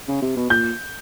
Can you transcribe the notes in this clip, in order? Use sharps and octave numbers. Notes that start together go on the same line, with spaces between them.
C#3
C3
B2
A#2 G6